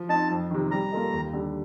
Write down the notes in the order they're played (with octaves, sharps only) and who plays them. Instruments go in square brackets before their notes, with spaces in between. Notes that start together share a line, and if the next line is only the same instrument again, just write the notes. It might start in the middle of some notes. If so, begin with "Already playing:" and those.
Already playing: [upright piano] F3
[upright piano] C4 D#4 [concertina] A5
[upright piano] F2
C3 D#3
[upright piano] G3 [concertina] A#5
[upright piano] A#3 F4 A4 D#5
D#2
D3 G3